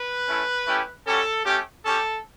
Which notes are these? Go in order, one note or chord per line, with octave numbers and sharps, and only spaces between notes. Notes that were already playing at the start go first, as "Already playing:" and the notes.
Already playing: B4
A3 C#4 E4
A3 C#4 E4 G4
G3 C#4 F#4 A4
A3 C#4 G4
C#4 G4 A4